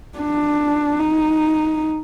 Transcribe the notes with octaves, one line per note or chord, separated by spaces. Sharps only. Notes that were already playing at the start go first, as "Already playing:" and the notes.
D4
D#4